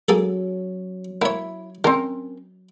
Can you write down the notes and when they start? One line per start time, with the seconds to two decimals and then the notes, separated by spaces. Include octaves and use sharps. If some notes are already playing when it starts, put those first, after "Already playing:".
0.08 F#3 A#3 G#4 A4
1.22 A#3 E4 C#5
1.84 D#3 C4 C#4 A#4